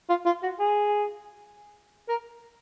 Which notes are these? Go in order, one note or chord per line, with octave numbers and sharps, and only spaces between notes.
F4
F4
F#4
G#4
A#4